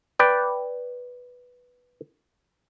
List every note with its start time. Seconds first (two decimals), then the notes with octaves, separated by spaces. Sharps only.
0.19 B4 D5 G5